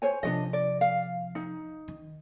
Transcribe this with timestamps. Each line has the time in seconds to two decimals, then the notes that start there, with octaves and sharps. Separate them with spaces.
0.02 C5 C#5 G#5
0.23 C3 F3 D4 F#4 D#5
0.53 D5
0.81 F5
1.35 D#4
1.88 D#3